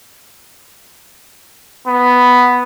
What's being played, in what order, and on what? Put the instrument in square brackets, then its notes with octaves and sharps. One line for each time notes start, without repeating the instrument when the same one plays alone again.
[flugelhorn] B3